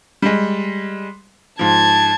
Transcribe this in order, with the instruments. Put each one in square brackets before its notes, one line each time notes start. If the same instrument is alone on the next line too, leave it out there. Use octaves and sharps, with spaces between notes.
[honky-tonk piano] G3 G#3
[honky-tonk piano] G#2 F3 [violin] A5 G#6